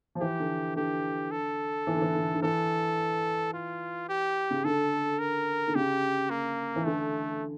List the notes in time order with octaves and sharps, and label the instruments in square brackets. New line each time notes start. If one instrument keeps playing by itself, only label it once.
[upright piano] F3
[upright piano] E3 [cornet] G4
[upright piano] D3
[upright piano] D3 [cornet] G4
[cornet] A4
[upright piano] E3
D3
E3
D3
D3
[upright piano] E3 [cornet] A4
[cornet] F4
G4
[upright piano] C#3
[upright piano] D3 [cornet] A4
[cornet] A#4
[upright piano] D3
[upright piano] C#3 [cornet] G4
[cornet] A#3
[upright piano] E3
[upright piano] D3 [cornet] A3